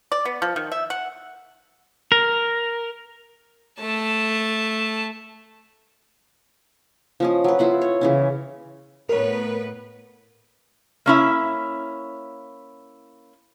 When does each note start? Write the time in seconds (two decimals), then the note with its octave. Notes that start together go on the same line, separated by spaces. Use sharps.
0.12 D5
0.25 B3
0.42 F3
0.56 D#3
0.72 E5
0.90 F#5
2.12 A#4
3.79 A3 A5
7.20 F3 C#4 D#5
7.44 F#3 B4
7.59 E4 F4 F#5
7.81 C#5
8.01 C#3 E3 C#4
9.09 A2 B3 A#4 B4 C#5
11.06 A#3 C#4 E4 E5